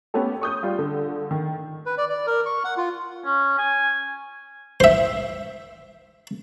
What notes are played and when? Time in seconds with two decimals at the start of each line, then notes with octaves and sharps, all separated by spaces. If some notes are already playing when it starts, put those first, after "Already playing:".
0.14 A3 B3 C#4 G4 A4
0.41 C#6 D#6 G6
0.63 G3 F4
0.79 D3
1.31 D#3
1.86 B4
1.98 D5
2.10 D5
2.27 A#4
2.46 C#6
2.64 F#5
2.77 F4
3.25 C#4
3.58 G#5
4.80 C5 E5